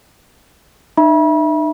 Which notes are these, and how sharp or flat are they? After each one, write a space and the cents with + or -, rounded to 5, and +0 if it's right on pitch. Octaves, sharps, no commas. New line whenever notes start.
D#4 -40 E5 +0 B5 -40